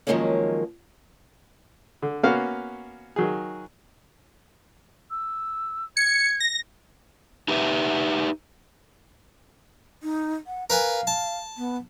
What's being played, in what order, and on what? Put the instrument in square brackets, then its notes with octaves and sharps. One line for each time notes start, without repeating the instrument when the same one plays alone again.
[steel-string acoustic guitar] D#3 F3 F#3 G#3 A#3 C#4
[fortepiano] D3
A#3 B3 C#4 F#4 F5
D#3 F#3 G#4
[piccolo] E6
[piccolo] G#6 [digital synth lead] C#7
[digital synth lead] A#6
[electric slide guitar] D#4 G4 B4 E5
[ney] D#4
F#5
[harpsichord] A#4 B4 G#5 [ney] F5
[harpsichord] A5
[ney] B3